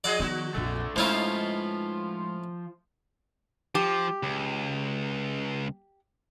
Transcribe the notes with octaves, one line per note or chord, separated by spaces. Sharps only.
F3 G#4 D5 D#5 F#5
D#3 F3 B3 F#4
A#1 F2 D3 A3
A2 F3 G#3 B3 C#4 D#4 F4 C5
F3 G4
C#2